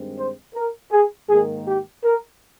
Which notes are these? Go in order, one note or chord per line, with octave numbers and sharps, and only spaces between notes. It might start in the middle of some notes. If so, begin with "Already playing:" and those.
Already playing: G2 D#3 G#3 C4
C5
A#4
G#4
G#2 D#3 A#3 G#4
G4
A#4